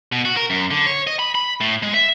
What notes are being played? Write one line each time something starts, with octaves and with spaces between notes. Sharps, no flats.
B2
F#4
A#4
F#2
D3
C#5
D#5
B5
B5
A2
G#3
E5